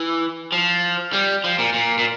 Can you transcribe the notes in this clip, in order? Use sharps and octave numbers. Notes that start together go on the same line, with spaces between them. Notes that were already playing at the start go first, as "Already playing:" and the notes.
Already playing: E3
F3
G3
F3
A#2
A#2
A#2